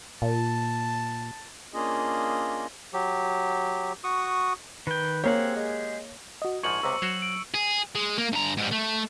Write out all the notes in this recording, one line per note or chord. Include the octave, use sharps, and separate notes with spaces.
A#2 A5
A#3 C#4 D4 F4 G#4 D#5
F#3 G4
F#4 C#6 D#6
D#3 B4 G5
A#3 C4 G4 G#4 C#5 F#5
G#3
F#4 D#5
A#1 G#2 F3 C#6 G#6 C#7 F#7
C#2 C3 C5 A#5 E6
F#3 F#4 C5 C#5
D7
G#4
G#3
A#3
G2 A#5
G#2 G3
A3